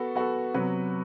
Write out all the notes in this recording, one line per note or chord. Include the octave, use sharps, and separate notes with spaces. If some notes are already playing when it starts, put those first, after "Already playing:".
Already playing: B3 F#4 A4
B3 F#4 A4
C3 F#3 B3 F#4 B4